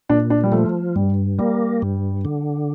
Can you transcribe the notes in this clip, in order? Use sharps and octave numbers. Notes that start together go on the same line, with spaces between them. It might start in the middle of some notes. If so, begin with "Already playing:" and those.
A#2 D4
D4
G3
F3 A3
G2 G3
G3 A#3
G2
D3